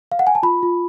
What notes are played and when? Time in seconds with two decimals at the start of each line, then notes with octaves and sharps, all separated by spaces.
0.12 F5
0.19 F#5
0.27 G#5
0.35 A5
0.43 F4 B5
0.63 F4